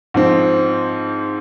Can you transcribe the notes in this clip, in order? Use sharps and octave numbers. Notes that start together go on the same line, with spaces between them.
G#2 F3 C4